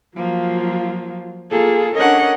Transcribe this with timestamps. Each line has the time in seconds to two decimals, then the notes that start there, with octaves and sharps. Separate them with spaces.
0.16 F3 F#3 A#3 F4
1.51 A#3 F4 G#4 A4
1.95 C#4 D4 A#4 C#5 D#5 F#5